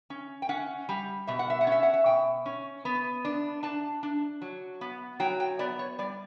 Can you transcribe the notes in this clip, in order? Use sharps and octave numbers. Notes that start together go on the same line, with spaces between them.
C#4
G5
C#4 F#5
G3
B2 E5
F#5
E5
F#5
C#4 E5
F#5
E5
B2 G5
C#4
B3
D4
D4 A5
D4
F#3
B3
F#3 G5
G5
B3 D5
C#5
G3 D5